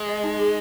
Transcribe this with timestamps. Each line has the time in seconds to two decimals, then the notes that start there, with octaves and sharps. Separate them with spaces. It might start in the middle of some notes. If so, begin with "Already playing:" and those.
Already playing: G#3
0.09 D#5
0.24 D#4
0.39 G#4